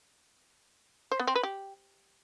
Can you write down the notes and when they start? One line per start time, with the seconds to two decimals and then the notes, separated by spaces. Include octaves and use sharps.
1.11 C5
1.19 B3
1.27 C4
1.35 B4
1.43 G4